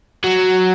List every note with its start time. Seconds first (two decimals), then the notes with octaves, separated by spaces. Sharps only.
0.24 F#3